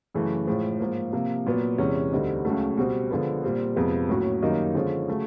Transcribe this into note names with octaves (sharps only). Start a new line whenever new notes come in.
F#2 C#3 E3 A3
A2 F3 G#3
G#2 F3 A#3
C3 F3 A#3
A#2 F#3 B3
E2 C3 E3 G#3 C#4
D2 D3 G3 C4 D#4
C#2 C#3 F#3 A3
B2 G3 C4
D3 F3 G#3 B3
A#2 G3 C4
F2 C3 F3 G#3 B3
A2 F#3 A#3 C#4 F#4
F#2 D#3 G3 A#3 D#4
D3 F3 G#3 C#4
C#3 F#3 A3